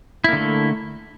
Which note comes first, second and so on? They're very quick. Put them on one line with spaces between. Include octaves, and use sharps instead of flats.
E4 A#3 D3 A3